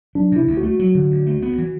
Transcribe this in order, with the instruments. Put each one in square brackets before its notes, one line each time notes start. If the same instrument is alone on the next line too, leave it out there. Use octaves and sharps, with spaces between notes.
[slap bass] F#3 [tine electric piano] D4
[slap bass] C3 [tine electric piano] E4
[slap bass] D2
[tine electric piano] F#4
[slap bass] A3
F#3
D3
D2
A3
B3
E3